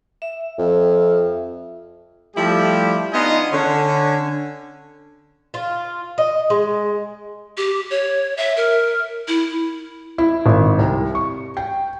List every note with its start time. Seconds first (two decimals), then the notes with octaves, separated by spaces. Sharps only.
0.22 E5
0.58 F2
2.36 F3 G3 A3 E4 G4
3.12 B3 D4 D#4 F4 D#5 G#5
3.52 D3 C#4
5.54 F4
6.18 D#5
6.50 G#3
7.57 G4
7.90 C#5
8.37 E5
8.57 A#4
9.28 E4
10.18 E4
10.46 G#1
10.79 C2
11.15 C#6
11.57 G5